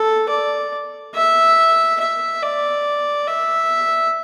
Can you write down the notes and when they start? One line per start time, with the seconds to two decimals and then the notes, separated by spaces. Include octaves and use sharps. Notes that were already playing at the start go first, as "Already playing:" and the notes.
Already playing: A4
0.29 D5
1.15 E5
2.00 E5
2.43 D5
3.27 E5